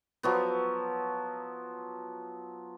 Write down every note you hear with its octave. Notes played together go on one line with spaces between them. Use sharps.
F3 F#3 B3